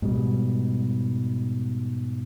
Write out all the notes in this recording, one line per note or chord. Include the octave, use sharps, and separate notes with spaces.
G#2 B2 G3